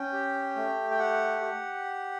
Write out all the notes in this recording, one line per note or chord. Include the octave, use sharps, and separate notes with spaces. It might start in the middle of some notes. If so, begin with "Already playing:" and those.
Already playing: C#4 G5
G4
A3
G5
G4 F#5
G4